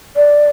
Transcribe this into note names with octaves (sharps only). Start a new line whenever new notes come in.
D5